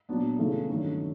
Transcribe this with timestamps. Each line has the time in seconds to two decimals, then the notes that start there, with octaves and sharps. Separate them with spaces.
0.09 A#2 F#3 B3 D4
0.38 C#3 E3 A3 C#4
0.69 G2 D#3 F#3 A3 C#4